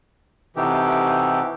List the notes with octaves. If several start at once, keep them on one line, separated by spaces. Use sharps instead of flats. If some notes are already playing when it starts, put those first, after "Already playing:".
C3 E3 D#4 F#4 G4 A4